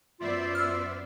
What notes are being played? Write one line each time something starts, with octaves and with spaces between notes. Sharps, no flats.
F#2 B3 F4 C5 D5 E5
E6 F6